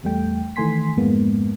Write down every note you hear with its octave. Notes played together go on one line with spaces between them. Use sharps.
A1 E2 G3 A3 G5
D#3 E3 A3 G#5 C6 B6
F2 G#2 G#3 A#3 B3